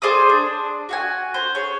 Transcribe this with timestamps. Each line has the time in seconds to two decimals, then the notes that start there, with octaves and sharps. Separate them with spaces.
0.02 G#4 C5 D5 D#6
0.29 D4
0.89 F#4 F#5 G#5
1.34 C5
1.55 G#4 C#5